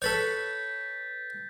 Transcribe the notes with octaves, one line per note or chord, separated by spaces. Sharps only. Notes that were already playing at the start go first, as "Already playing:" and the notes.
A4 B4 C#5 G6 A6 B6